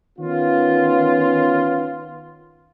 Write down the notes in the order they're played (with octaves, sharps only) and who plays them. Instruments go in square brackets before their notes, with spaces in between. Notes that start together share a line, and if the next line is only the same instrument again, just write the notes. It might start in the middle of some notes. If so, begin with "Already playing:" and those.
[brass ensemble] D#3 B3 C#4 F4